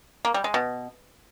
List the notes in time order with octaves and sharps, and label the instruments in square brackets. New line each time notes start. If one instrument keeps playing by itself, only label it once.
[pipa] A#3
G3
G#3
B2